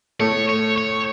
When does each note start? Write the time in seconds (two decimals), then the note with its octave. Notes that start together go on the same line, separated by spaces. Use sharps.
0.20 A2 A3 C#5
0.49 C#5
0.78 C#5